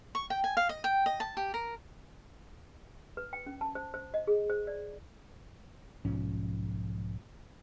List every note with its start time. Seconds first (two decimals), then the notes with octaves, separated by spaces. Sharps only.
0.15 C#6
0.30 G5
0.44 G#5
0.57 F5
0.69 D#5
0.84 G5
1.06 D#5
1.20 A5
1.37 G4
1.54 A#4
3.17 B4
3.33 G5
3.46 C#4
3.61 A5
3.75 C5
3.94 C5
4.14 D#5
4.27 G#4
4.50 C5
4.67 D5
6.05 B1 G#2 F3 C#4